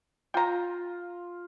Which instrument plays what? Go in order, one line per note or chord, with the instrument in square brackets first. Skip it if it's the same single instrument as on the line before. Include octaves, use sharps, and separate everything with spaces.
[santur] F4 [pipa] G5 A#5